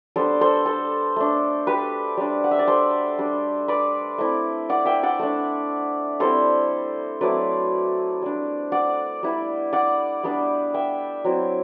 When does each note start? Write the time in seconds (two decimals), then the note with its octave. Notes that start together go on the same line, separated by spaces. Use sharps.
0.16 G3 B3 D4 A4 C5
0.41 A4 C5
0.66 A4 C5
1.16 A3 D4
1.67 G4 B4
2.17 G3 D4
2.44 F#5
2.51 E5
2.59 D5
2.67 A4 C5
3.18 G3 D4
3.68 B4 D5
4.18 A3 C4 E4
4.69 D5 F#5
4.86 E5 G5
5.03 D5 F#5
5.19 A3 D4
6.20 G3 C4 E4 A4 C5
7.21 F#3 A3 C4 E4 B4 D5
8.22 G3 D4
8.72 D5 F#5
9.23 G3 B3 E4
9.73 D5 F#5
10.24 G3 B3 D4
10.74 E5 G5
11.24 F#3 C4 E4